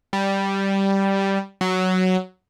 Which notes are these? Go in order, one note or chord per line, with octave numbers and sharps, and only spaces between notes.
G3
F#3